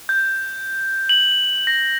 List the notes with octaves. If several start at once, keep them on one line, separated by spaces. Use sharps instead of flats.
G6
F#7
A#6